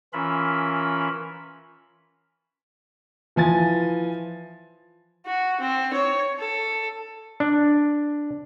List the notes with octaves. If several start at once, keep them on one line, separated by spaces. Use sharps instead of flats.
E3 C#4 F4 A#4 E5 B5
E3 F3 G#5 A6
F#4
C4
C#5
A4
D4